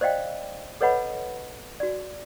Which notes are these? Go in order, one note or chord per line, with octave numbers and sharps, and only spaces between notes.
C5 D5 D#5 F5 G5
A4 B4 C#5 D#5 F#5 B5
F#4 D5